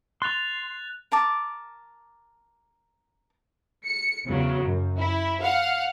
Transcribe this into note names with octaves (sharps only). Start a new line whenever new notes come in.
C6 F#6 A6 F7
A#4 A5 D6
C#7
E2 C#3 F#3
F#2
E4
F5 F#5